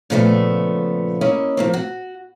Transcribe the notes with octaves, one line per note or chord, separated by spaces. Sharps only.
A#2 C#3 F3 A3 B3 E5
A#3 C#4 E4 D#5
F3 A#3 C4
F#4